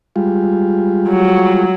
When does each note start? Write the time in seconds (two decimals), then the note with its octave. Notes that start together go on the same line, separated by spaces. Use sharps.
0.16 G3 G#3 F4
1.08 F#3